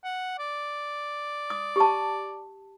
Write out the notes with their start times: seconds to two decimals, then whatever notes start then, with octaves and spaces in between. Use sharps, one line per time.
0.04 F#5
0.39 D5
1.50 D#6
1.76 G4 A5